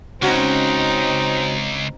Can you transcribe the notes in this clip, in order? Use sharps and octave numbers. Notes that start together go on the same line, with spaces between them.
C#2 C4 C#4 D#4 F#4